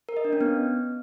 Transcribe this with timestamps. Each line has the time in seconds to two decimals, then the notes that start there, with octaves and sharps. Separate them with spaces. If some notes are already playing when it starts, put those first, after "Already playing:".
0.09 A#4
0.17 D#5
0.25 D4
0.33 C#4
0.41 B3